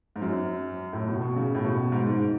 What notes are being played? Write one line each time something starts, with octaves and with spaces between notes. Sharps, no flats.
G#2
F#2
A2
B2
B2
C#3
A2
B2
G#2
G#2